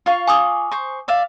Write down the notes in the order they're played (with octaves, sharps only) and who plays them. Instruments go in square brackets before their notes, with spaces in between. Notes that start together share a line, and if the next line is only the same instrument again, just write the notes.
[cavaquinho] F4 F5 C#6
[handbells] G#5 D6 D#6
[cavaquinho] C5 C#6
D5 E5 F5